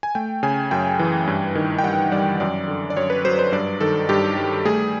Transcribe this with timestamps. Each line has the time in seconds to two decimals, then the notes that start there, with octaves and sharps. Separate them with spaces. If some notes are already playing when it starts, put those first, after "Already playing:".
0.03 G#5
0.15 A3 G5
0.43 C#3 G#5
0.71 F#2 G5
0.99 E3
1.27 G2
1.55 D#3
1.79 G5
1.83 G2 F#5
2.12 G3 D5
2.40 F#2 D5
2.68 D3
2.90 D5
2.97 F#2 C#5
3.10 B4
3.25 F#3 C5
3.39 C5
3.52 G2 D5
3.80 D#3 A4
4.09 G2 G4
4.37 G3
4.65 A3 G#4